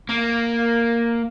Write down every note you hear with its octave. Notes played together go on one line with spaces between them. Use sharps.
A#3